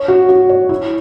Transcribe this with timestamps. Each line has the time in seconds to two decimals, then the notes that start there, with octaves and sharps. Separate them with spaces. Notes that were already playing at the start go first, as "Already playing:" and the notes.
Already playing: C#5
0.08 F#4
0.29 F#4
0.49 C#5
0.69 E4